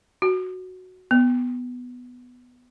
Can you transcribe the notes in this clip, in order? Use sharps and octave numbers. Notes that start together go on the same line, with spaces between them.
F#4
B3